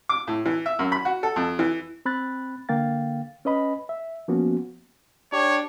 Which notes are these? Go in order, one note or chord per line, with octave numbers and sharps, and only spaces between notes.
D6
A2
E3
E5
F#2
B5
F#4
A4
F2
E3
C4 B5 F#6 A6
D3 A#3 F5 G5 A6
C#4 B4 D#5 B5
E5
F3 A#3 B3 C#4 F#4
D4 G4 C#5